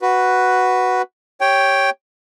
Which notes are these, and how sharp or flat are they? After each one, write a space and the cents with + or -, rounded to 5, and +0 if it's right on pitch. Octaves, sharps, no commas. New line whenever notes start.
F#4 +0 B4 +0
G4 +0 C#5 +0 G5 +0